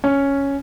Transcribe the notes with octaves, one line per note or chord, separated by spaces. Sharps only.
C#4